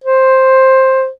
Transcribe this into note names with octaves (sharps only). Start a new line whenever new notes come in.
C5